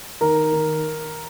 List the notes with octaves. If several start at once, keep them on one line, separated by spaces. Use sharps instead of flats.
D#3 A#4
D#3